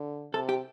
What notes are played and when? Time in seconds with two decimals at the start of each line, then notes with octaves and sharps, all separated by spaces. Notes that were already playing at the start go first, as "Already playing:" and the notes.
Already playing: D3
0.34 C3 A4
0.49 G4